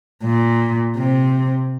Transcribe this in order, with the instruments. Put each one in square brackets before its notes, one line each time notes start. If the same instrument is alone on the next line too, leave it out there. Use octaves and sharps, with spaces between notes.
[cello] A#2
C3